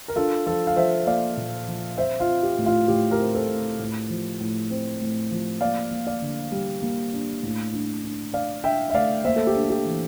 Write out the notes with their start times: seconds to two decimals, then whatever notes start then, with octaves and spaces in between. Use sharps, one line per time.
0.08 A#4
0.16 D4 F4 A4
0.46 F3 F4 A4
0.67 F5
0.76 F3 C5 E5
1.07 A#3 D5 F5
1.37 A#2
1.68 F3
1.98 C4 C5 E5
2.20 F4
2.28 C4
2.43 G4
2.58 A2
2.66 F4
2.88 A2 G4
3.11 G4 A#4
3.19 C4
3.34 A4 C5
3.49 A2
3.79 A2
4.10 F3
4.40 A2
4.70 C4
5.01 A2
5.31 F3
5.61 A#3 D5 F5
5.91 A#3
6.07 D5 F5
6.22 D3
6.52 G3
6.82 A#3
7.13 D4
7.43 A2
7.73 D4
8.03 D4
8.34 D4 D5 F5
8.64 D4 E5 G5
8.90 E5
8.94 A3 D5 F5
9.24 A#3 C5 E5
9.36 A4
9.47 G4
9.55 D4
9.63 A4
9.70 G4
9.85 E3